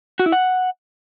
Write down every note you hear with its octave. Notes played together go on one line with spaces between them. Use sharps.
F#4
E4
F#5